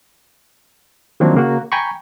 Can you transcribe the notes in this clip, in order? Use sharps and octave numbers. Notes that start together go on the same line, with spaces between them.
D#3 F3 F#3 A#3 C4 D4
C#3 A#3 F#4
G5 G#5 A#5 B5 C#6